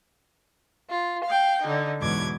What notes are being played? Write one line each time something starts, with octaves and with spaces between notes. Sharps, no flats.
F4
F5 G5
D3 D#4
E2 G#2 B2 F#3 D6 G#6